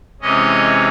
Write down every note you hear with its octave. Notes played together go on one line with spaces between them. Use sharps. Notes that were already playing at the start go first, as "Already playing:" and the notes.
C3 E3 G#3 C#4 D#5